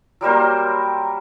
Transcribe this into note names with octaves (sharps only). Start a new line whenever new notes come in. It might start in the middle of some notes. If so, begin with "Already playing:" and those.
F#3 G3 A#3 C5